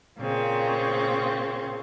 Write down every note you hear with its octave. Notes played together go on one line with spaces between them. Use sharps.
A#2 C#3 C4